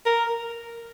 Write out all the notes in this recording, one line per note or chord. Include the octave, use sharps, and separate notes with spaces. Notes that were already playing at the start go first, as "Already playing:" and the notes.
A#4